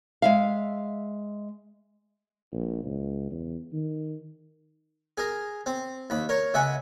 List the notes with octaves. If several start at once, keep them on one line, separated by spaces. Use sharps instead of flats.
G#3 E5 F5
A#1
C#2
E2
D#3
G#4 A#4
C4
D#2 B5
A#4 C#5
C#2 E5 F#5 G#5